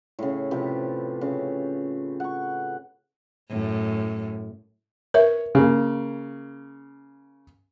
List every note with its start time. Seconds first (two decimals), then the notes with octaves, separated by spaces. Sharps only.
0.19 A2 C#3
0.51 C3 F3 G4 B4
1.21 C#3
2.20 F#5 C#6
3.49 F#2 A2
5.14 A#4 B4 C#5 E5
5.55 C#3 A#3